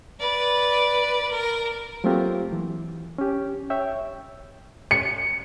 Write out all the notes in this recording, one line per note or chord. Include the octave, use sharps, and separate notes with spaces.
B4 D5
A#4
F#3 A3 A#3 C4 F4 G4
E3
C#4 G4
C#5 E5 G5
C#7